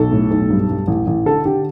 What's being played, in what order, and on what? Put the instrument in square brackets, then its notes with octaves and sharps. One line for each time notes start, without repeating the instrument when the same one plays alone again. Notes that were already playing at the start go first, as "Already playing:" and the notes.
Already playing: [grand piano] B1 A4
A2
B1
G2
G2
A1
A1
D3 A4
D3 G4